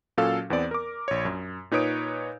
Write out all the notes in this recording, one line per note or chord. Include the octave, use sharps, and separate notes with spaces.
A#2 F#3 C#4 A4 F5 E6
E2 B3 C4 D5
A#4 D6
A#1 C#5
F#2
A#2 D#4 B4 C#5 D#6 D7